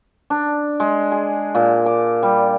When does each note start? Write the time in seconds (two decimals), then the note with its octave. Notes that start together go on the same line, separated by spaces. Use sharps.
0.30 D4
0.80 G#3
1.12 G#4
1.55 A#2
1.86 D6
2.23 G3